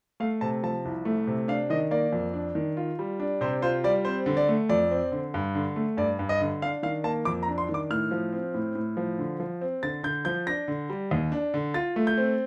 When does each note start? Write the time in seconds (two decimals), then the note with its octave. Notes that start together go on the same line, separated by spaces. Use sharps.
0.20 A3 F5
0.41 C3 A5
0.63 F3 A5
0.85 C2
1.05 A3
1.27 C3
1.48 D4 F5
1.70 D#3 D#5
1.91 A#3 D5
2.13 F2
2.34 D4
2.55 D#3
2.77 F4
2.99 G3
3.20 D4
3.41 C3 C5
3.62 F4 C5
3.84 G3 D5
4.05 C4 C5
4.26 D3
4.37 D5
4.48 A3
4.69 F2 D5
4.91 C4
5.12 D3
5.34 G2
5.55 D3
5.76 A3
5.97 G2 D5
6.19 G2
6.29 D#5
6.41 D3
6.62 D4 F5
6.83 D#3 F5
7.04 A#3 A5
7.25 F2 D6
7.43 A#5
7.48 D4
7.58 C6
7.69 D#3
7.74 D6
7.90 A2 F6
8.11 F3
8.33 C4
8.54 A2
8.75 A2
8.97 F3
9.18 D3
9.40 F3
9.61 C4
9.83 D3 A6
10.03 D3 G6
10.25 F3 G6
10.47 D4 A#6
10.68 D3
10.90 G3
11.11 D#2
11.32 D4
11.54 D3
11.74 F4 A6
11.96 A3
12.07 G6
12.18 C4